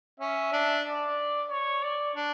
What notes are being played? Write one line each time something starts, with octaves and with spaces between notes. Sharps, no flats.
C#4 E5
D4
D5
C#5
D5
D4